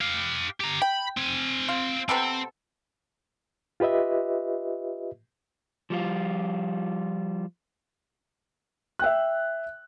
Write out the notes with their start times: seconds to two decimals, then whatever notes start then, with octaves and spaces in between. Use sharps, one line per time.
0.01 G4 F5
0.61 G4 A#5
0.82 G5 B5
1.17 C4 G#5
1.69 F4
2.09 C3 B3 C4 A4
3.80 F4 G4 B4 D#5 E5
5.90 F3 G3 F4
8.99 E5 G5 F#6